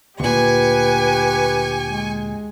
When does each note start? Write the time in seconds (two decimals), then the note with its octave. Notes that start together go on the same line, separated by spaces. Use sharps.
0.20 D2 A#2 G4 B4 G#5 C#6
1.84 G#3